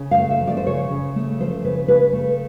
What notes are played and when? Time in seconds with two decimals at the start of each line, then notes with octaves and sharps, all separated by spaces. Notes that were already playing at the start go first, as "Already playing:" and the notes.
Already playing: C#3
0.11 F5
0.17 A3
0.30 E5
0.41 F3
0.47 D5
0.57 C5
0.66 C#3 C#5
0.91 C#3
1.16 A3
1.40 F3 C5
1.64 C#3 B4
1.88 C#3 B4
2.13 A3